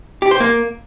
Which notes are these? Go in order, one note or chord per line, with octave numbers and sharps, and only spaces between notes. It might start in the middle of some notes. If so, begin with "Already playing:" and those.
G4
C5
A#3